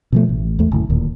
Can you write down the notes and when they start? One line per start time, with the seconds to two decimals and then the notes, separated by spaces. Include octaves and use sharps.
0.12 B2 F3 A3
0.29 A1
0.59 E2 A3
0.72 F#1 D2 A2
0.90 D1 D#2 A#2